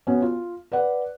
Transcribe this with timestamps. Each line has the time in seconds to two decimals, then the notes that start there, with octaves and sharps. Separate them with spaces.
0.07 B2 B3 C#4
0.22 F4
0.72 B4 D5 F#5